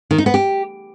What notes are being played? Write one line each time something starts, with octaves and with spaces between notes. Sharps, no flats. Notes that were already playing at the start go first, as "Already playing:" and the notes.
D#3
D#4
B3
G4